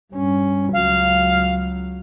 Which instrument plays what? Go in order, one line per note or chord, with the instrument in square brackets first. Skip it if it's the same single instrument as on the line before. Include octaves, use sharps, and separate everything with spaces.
[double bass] G2 C#4
[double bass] C#2 F#3 [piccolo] F5